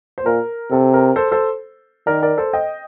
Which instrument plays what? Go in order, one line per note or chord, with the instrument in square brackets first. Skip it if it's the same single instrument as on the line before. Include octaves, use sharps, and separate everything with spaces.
[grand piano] C5
[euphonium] A#2 [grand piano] A#4
[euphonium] C3 [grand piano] A4
[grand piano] A#4
A4 C5
A4 C5
[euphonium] D#3 [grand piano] A#4 D5
[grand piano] A#4 D5
A4 C5
D#5 G5